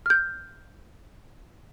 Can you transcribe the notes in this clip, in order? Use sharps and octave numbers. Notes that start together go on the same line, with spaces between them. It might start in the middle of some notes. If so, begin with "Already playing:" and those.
F6 G6